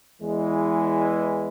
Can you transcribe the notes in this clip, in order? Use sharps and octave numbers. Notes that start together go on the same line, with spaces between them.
E2 E3 G#3 E4